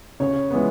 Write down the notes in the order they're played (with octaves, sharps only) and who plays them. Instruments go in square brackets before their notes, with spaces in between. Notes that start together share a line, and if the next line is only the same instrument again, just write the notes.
[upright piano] C#3 C#5
E3 G#3 B3